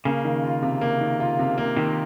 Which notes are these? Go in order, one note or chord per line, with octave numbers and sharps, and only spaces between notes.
C#3 A#3
D#3
F4
C3
A#3
D#3
F4
C3
A#3
C3 D#3